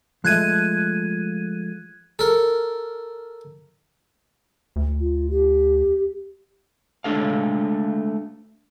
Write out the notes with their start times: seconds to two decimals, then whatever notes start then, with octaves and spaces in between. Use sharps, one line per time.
0.24 F3 G#3 A3 F#6 G#6 D#7
2.19 A4 A#4
4.76 D2
5.00 F4
5.30 G4
7.04 G#3 A3 D4 A4 F5